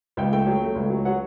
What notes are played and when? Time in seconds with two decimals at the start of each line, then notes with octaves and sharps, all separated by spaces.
0.17 C#2 G5
0.32 A3 G5
0.46 F#3
0.62 A3
0.75 C#2
0.90 F#3
1.05 F#3 F#5